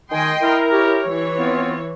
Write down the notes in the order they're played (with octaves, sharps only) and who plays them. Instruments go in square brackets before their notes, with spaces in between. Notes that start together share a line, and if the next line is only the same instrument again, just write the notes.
[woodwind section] D#3 G#5 [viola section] D#5 G5 C6
[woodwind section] E4 A#4
[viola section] G4 C#5
E3 C#5
[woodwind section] B3 C4 F4